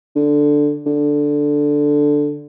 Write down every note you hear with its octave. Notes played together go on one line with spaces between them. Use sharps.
D3
D3